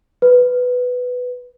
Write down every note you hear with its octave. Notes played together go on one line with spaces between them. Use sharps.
B4